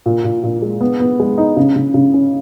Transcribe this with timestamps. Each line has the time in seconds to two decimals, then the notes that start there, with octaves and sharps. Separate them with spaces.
0.06 A#2
0.24 A#2
0.43 A#2
0.62 G#3
0.81 B3
1.00 B3
1.20 G#3
1.38 D#4
1.57 C#3
1.76 C#3
1.94 C#3
2.14 C#4